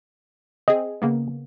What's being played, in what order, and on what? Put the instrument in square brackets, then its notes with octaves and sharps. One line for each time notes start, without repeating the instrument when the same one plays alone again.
[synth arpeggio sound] C4 G#4 [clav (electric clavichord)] D#5
[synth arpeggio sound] C#3 A#3 B3